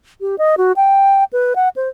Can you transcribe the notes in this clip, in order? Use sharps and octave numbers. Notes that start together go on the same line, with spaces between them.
G4
D#5
F#4
G5
B4
F#5
C5